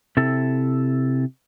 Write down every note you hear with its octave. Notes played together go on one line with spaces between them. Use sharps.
C3 E4 A4